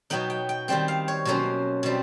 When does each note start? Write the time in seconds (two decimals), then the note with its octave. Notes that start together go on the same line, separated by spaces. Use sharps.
0.10 B2 F#3 B3 D#4 G5
0.30 G5
0.49 G5
0.68 D#3 G3 C4 G5
0.88 F5
1.08 C#5
1.25 B2 F#3 A#3 C#4 C5
1.83 B2 G3 C4